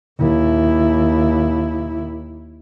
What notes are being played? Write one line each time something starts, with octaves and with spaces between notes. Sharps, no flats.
D#2 E4